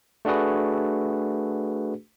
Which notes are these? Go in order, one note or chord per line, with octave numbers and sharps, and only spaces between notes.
A3 D4 F#4 G#4 B4